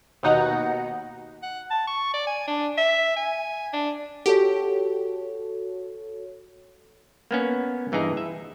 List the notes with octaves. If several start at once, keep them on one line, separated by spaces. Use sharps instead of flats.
D#2 B2 D#4 F#5 A#5
F#5
A5
C#6
D5
G#5
D4
E5
G#5
D4
F#4 G4 A4 C#5
A#3 B3 C#4
G2 E3 D#4 G#4 A#5
E5